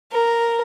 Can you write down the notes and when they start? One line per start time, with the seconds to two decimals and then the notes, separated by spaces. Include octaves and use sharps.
0.12 A#4